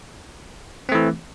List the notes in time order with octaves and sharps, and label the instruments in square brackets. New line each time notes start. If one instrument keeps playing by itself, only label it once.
[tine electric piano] C4
A3
E3